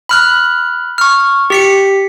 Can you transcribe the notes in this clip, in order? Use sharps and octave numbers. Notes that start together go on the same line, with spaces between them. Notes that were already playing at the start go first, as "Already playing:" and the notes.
B5 F6 F#6
C#6 F6
G4 B6 C#7